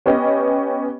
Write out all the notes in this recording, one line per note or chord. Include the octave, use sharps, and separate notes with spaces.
B3 C#4 G4 D#5